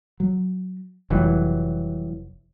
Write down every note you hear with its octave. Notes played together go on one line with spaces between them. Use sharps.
F#3
F1 E3 F#3 G3